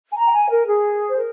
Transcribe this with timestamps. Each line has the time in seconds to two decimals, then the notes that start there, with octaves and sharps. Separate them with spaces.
0.10 G#5
0.16 A#5
0.27 G5
0.32 G#5
0.50 A#4
0.66 G#4
1.09 C5
1.17 A#4